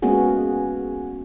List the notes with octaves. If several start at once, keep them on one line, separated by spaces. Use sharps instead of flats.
G#3 A#3 B3 C#4 F#4 G#4